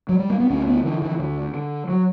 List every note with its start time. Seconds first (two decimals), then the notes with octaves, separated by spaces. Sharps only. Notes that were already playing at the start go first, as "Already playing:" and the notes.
0.09 F#3
0.19 G3
0.30 A#3
0.40 B3
0.50 D2 C#4
0.67 B3
0.84 D3 E3
1.02 E3
1.19 D2 D3
1.54 D3
1.89 F#3